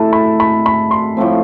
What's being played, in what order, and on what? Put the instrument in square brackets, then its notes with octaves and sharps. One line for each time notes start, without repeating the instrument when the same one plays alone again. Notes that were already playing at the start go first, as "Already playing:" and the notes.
Already playing: [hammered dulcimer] A3 E4 A4 [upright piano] A5
[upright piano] B5
B5
B5
C6
[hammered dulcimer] A2 F3 A3 C4